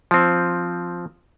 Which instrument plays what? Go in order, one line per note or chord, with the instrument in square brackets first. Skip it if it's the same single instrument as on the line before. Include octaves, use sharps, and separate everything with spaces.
[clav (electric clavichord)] F3 C4